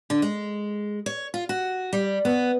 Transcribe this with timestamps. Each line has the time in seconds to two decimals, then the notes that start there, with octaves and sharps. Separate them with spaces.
0.10 D3
0.22 G#3
1.06 C#5
1.34 F4
1.49 F#4
1.93 G3
2.25 B3